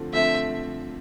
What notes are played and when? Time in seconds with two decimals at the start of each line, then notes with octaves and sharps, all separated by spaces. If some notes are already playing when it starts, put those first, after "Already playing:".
Already playing: D3 F3 A3 C4
0.13 D3 F3 A3 C4 E5